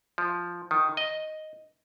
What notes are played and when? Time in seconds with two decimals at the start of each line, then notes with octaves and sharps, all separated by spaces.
0.18 F3
0.71 D#3
0.97 D#5